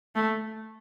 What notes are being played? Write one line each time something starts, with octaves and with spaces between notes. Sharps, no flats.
A3